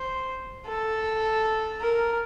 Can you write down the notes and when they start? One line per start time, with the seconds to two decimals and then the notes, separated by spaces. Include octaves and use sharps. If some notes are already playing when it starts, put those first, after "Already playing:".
Already playing: C5
0.66 A4
1.81 A#4